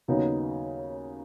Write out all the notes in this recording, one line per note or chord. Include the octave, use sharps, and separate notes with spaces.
D#2 C#3 F#3 B3 D#4